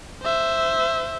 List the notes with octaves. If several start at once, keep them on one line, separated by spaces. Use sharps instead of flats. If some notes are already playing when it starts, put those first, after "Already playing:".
C5 E5